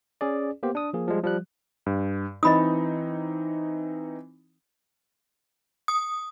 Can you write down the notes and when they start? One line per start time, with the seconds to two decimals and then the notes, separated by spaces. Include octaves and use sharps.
0.21 C#4 G#4 D5
0.63 A#3 B3 G4 C5
0.75 D4 D#6
0.93 F3 A#3 G#4
1.08 F3 G3 G#3
1.24 F3 G3 F#6
1.86 G2
2.43 E3 C4 D#4 D#5 B5 D#6
5.88 D#6